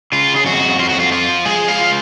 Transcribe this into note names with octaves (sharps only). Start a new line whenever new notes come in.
C#3 F4
G#4
F2 F#4
F2 F4
F#4
F4
F3 F4
G#3 G#4
F5
F4